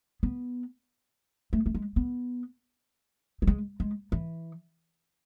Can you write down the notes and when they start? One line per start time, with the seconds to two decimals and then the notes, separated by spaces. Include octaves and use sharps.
0.23 B3
1.53 A3
1.66 A3
1.75 G#3
1.96 B3
3.42 F#3
3.47 G#3
3.80 G#3
4.12 E3